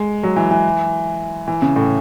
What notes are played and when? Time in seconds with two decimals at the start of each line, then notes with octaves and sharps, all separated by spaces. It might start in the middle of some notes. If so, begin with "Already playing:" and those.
Already playing: G#3
0.23 F#3
0.37 E3
0.51 E3
1.48 E3
1.62 C#3
1.76 A2